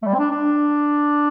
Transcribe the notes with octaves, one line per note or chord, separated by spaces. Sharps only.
A3
G3
C4
D4
D4